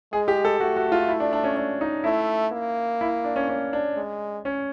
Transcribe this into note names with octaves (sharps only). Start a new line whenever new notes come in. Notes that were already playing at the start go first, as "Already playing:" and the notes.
G#3 G#4
G4
A4
A3 F#4
F#4
F4
E4
D4
D4
C#4
D4
D#4
A3 E4
A#3
E4
D4
C#4
C#4
D4
G#3
C#4